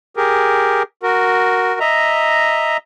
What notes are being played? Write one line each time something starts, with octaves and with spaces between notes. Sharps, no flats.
G4 G#4 A#4
F#4 A#4
D#5 E5 A#5